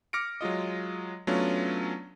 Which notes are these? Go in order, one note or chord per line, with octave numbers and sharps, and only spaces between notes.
D6 F6 A#6 C#7 D7
F#3 G#3 F4 D#5
F#3 A3 B3 C#4 D4 F4